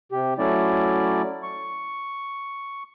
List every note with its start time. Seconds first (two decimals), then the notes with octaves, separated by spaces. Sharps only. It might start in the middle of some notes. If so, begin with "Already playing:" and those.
0.12 C3 G4
0.38 F#3 A3 C#4 E4 D5
1.43 C#6